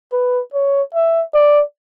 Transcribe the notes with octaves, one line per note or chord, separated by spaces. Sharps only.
B4
C#5
E5
D5